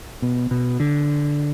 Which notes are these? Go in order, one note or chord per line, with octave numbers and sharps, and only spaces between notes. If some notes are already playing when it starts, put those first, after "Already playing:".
B2
B2
D3